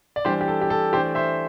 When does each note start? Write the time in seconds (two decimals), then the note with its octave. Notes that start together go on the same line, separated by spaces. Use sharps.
0.16 D5
0.25 E3 G3 D4 G4 C5
0.41 G4
0.48 A4
0.61 G4
0.70 A4
0.93 E3 A3 D4 G4 C5
1.15 C5 E5